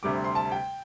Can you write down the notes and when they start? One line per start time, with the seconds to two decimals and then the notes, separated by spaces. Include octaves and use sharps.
0.03 D2 C3 G3 D6
0.24 C6
0.35 A5
0.52 G5